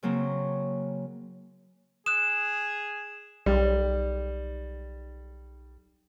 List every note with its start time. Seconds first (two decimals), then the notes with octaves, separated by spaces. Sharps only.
0.03 C#3 F#3 A#3 C4
2.06 G#4 D#6 F#6 E7
3.46 B1 G3